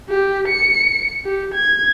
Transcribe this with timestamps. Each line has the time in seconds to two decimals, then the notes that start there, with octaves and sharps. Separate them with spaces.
0.10 G4
0.48 C#7
1.25 G4
1.55 G#6